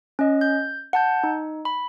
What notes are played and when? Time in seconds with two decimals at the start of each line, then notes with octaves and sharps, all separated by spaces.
0.19 C#4 D#5
0.41 G6
0.93 F#5 A5 G6
1.24 D#4
1.65 B5